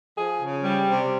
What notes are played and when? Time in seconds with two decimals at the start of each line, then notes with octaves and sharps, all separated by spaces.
0.17 F3 G#4
0.40 C#3
0.63 G3
0.88 C3